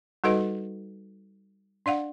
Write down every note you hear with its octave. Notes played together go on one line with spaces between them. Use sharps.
G3 D#4 F#4 A4 B4 D#5
D4 D5 F5 F#5